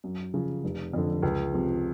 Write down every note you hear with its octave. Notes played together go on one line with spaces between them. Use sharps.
F#2
C#3 F3
F1
F2 D3
C#2
C3 F3